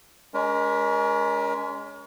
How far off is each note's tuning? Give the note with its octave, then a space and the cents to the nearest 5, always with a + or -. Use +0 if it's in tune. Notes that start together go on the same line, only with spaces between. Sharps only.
G#3 +0 C#4 +35 A#4 +35